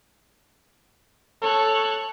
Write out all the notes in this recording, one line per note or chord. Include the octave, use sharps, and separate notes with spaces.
A4 C#5 F#6